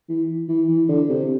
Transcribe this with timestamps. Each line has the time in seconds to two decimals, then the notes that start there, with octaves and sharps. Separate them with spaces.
0.09 E3
0.49 E3
0.69 E3
0.89 D3
1.09 C3